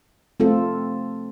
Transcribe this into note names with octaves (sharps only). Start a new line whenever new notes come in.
A3 C4 F4 A4